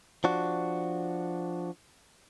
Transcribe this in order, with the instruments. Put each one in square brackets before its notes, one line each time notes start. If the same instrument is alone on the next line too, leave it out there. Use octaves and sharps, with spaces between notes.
[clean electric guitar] F3 D4 F#4